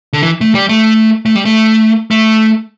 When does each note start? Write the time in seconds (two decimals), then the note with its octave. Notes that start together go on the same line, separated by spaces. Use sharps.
0.13 D3
0.23 E3
0.41 A3
0.55 G3
0.69 A3
1.26 A3
1.35 G3
1.45 A3
2.11 A3